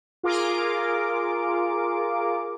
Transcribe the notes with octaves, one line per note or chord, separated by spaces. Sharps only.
F4 G#4 A#4 D6